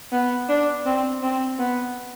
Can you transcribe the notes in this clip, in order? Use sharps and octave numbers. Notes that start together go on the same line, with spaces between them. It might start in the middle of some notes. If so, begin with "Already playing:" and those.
B3
D4
C4
C4
B3